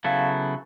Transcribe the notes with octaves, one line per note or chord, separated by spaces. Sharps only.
C#3 F#3 B3 E4 A4 F5